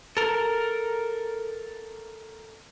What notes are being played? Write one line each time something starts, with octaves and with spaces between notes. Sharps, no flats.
A4 A#4